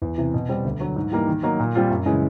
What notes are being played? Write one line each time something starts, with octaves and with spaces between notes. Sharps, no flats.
E2
C3 E3
B2
G3 C4
D2
D3 F#3
G#2
E3 G3 A#3 D#4
D#3
F#3 A#3 D#4
A#2
G3 C4 F4
F#2
C#3 E3 G#3